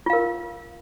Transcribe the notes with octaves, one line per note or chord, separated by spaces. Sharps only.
F4 A#4 F5